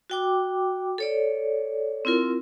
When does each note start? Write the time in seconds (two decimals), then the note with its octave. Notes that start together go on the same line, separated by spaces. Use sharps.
0.10 F#4 G5 D6
0.98 A4 C#5 D5
2.05 C4 E4 F4 A#4